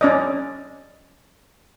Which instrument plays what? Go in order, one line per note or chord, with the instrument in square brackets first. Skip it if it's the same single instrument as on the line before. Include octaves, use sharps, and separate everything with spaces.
[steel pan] C#4 D5 D#5